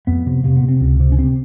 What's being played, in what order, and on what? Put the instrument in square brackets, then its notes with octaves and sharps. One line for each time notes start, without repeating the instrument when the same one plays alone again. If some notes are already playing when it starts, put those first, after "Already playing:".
[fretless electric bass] F2 B3
C3
C3 A#3
B3
C3
C4
C#2
C3
C#4
C3 C4